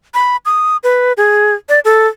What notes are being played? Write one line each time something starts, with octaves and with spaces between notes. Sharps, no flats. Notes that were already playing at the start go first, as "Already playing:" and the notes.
B5
D#6
B4
G#4
D5
A4